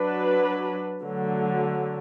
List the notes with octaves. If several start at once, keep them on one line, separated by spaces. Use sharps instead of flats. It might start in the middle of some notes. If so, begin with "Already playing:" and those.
Already playing: F#3 D4 B4
D3 F#3 A3